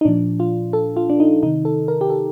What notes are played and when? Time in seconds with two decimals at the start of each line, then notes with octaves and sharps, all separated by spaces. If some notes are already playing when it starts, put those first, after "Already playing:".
0.01 D#4
0.05 A#2 F3 D4
0.40 F4
0.73 A4
0.97 F4
1.10 D4
1.20 D#4
1.43 C3 D#3 D#4
1.65 A4
1.88 A#4
2.01 G4
2.10 A4